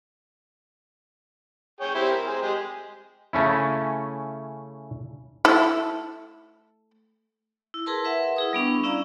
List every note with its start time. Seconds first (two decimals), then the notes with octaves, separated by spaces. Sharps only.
1.81 G#4 C#5 G5
1.95 C4 E4 G4
2.11 A#4
2.27 C4 G#4
2.42 G#3 G4 G#4
3.33 C#3 A3 C#4 E4
5.45 A3 E4 A4
7.74 E4
7.86 G#4 A#4 B4 A5 C6
8.05 B4 E5 F#5
8.36 E4 G#4 D#6
8.53 G3 B3 D4 C#6
8.83 C#4 E4 D5 F5 A#5